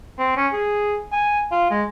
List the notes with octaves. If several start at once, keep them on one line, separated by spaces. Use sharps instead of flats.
C4
C#4
G#4
G#5
F4
G#3